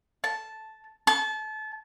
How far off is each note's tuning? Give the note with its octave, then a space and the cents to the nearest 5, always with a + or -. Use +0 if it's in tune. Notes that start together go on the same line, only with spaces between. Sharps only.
A5 -5
A5 -30